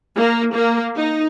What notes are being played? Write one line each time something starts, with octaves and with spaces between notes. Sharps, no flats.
A#3
A#3
D#4